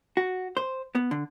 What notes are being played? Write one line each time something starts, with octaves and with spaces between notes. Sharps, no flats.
F#4
C5
B3
D3